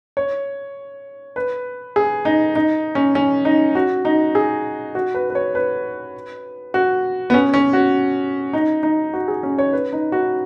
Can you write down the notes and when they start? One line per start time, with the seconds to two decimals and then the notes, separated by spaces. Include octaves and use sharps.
0.17 C#5
1.36 B4
1.96 G#4
2.25 D#4
2.55 D#4
2.95 C#4
3.15 C#4
3.45 D#4
3.75 F#4
4.05 D#4
4.35 G#4
4.95 F#4
5.15 B4
5.30 B4
5.35 C#5
5.55 B4
6.74 F#4
7.30 B3
7.34 C#4
7.54 C#4
7.73 F#4
8.53 D#4
8.83 D#4
9.14 F#4
9.28 G#4
9.43 C#4
9.58 C#5
9.73 B4
9.93 D#4
10.12 F#4